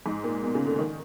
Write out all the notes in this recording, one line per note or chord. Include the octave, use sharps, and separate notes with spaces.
G#2
A#2
B2
C#3
D3
D#3